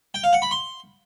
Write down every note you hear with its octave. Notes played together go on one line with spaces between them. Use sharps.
G5
F5
F#5
B5
C6